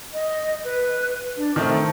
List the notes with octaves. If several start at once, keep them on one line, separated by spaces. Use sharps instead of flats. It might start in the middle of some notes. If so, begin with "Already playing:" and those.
D#5
B4
D4
D#3 A3 C4 A5